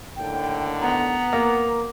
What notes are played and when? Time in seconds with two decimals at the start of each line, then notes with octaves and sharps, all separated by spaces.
0.16 D#2 A2 D3 G5
0.81 B3 A#5
1.33 A#3